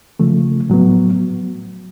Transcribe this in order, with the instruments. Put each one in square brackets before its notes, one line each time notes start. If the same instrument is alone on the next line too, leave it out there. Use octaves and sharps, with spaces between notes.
[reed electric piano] C#3 F3 A3
A2 F#3 B3